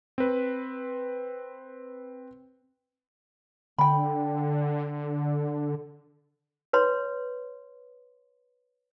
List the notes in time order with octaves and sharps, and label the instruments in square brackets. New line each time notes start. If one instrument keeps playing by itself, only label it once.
[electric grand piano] C4 B4
[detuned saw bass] D3 [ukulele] G5 B5
[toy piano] B4 C#5 C6